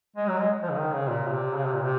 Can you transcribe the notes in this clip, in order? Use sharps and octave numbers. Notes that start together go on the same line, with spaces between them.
G#3
F#3
G#3
F3
C#3
D#3
C#3
A#2
C#3
C3
C#3
C3
A#2
C3